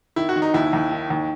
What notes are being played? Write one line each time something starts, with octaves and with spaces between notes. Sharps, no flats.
D#3 E4
F#4
D#3
D#4
D#2 E4
D#2
D#3
D#2